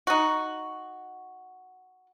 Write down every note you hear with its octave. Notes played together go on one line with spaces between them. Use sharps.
D#4 F#4